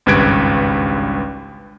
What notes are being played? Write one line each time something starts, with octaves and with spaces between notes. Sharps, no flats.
G#1 C#2 G2 B4 G#6 D7